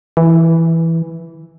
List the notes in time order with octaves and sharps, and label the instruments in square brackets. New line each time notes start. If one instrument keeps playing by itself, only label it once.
[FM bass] E3